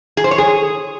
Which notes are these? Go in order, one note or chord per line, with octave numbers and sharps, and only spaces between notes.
G#4
C5
C#5
G#4